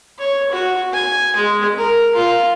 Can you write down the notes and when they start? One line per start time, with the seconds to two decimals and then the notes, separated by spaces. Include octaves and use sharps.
0.19 C#5
0.51 F#4
0.93 G#5
1.36 G#3
1.78 A#4
2.15 F4